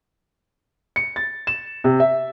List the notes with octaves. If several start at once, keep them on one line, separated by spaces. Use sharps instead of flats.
C#7
A6
E7
C3
E5